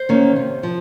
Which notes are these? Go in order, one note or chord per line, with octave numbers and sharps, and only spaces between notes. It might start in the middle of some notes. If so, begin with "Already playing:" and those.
Already playing: C5
D#3 A#3 C#4
C3
F3